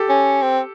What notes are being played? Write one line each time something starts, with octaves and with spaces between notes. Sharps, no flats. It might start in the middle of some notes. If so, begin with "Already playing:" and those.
Already playing: G4 A4
C#4
C4